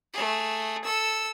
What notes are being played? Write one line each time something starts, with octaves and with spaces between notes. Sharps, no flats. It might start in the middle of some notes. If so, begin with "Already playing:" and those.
A3 G#4
A4 E6